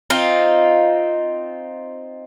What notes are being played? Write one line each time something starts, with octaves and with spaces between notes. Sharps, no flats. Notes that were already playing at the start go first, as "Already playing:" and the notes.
C4 D#4 F4